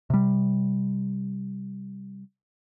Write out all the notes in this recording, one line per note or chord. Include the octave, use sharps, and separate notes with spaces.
C3 G3